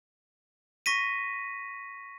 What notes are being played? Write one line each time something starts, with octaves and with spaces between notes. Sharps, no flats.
C#6 A#6 B6 D#7